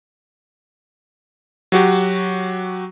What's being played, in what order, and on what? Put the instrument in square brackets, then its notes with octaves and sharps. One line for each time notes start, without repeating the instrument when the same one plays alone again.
[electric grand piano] F#3 F#4 G4